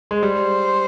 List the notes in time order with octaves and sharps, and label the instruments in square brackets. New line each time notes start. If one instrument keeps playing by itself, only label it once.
[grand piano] G#3
[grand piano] G3 [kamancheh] C5